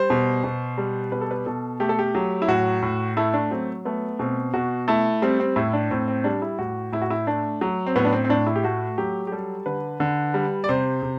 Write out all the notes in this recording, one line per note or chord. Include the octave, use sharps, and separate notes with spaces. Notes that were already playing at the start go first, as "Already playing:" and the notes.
Already playing: G3 C5
B2
B2
G3
B2 B4
A4
B4
B2 A4
A3 G4
A4
G4
F#3
E4
A2 F#4
A2
A3 E4
D4
F#3 C4
A3 B3
B2 C4
B2 F#4
A3 E4
G3 C4
C4
A2 E4
D4
A2 C4
C4
G3 D4
E4
A2 F#4
A2 E4
F#4
E4
A3 D4
F#3
C4
A2 B3
D4
C4
C4
A2 D4
E4
G4
A3 F#4
F#3 G4
G4
G3 A4
D3 B4
D3
G3
D5
C3 C5
C3